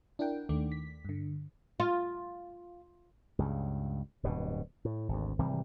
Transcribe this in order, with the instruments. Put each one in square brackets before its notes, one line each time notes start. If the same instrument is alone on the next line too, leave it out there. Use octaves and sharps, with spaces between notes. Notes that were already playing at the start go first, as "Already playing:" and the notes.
[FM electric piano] D4 E4 A#4 F#5 G5
D#2 D#3 A3 D4 D6
B6
G2 D3
[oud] F4
[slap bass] C#2 G2 C#3
D1 G2 B2
A2
G#1 D2
G#1 C3 E3 G3